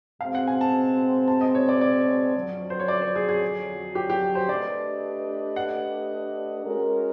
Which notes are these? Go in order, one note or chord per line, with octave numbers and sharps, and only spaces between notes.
B2 G#3 C4 F5
F#5
G#5
A5
A5
D#5
C#5
D5
D5
F2 D3 F#3
C5
C#5
D5
C5
G#4
G#4
G4
G4
C5
A3 D4 G4 B4 D5 D#5
F#5
G#3 C#4 F#4 A#4 D#5